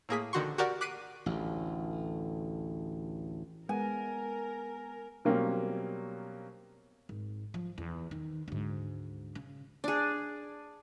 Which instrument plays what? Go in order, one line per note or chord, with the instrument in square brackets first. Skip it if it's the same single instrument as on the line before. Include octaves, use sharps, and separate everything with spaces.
[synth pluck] A2 A#3 G#4 B6
A#1 D3 D#3 F#4 C6 C#6
F#4 G4 A#4 D5 F#5
D6 F#6 B6 C7 D7 D#7
[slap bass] A1 D2
[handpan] G#3 F#5 [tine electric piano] B3 [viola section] A#4 [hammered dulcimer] G#5
[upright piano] B2 F#3 G3 A#3 C4 C#4
[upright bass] G#1
F3
E2
D#3
D2 G#2
C#3
[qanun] D4 G#4